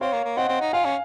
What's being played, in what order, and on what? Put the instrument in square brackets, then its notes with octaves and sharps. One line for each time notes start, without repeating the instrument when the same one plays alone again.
[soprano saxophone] C4 [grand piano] C#5 F5
[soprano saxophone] A#3
A#3
[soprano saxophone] C4 [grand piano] D#5 F#5
[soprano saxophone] C4
D#4
[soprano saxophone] F4 [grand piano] F5 G#5
[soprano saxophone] C#4